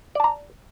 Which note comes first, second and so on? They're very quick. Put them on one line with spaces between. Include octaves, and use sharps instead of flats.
D5 A5 A#5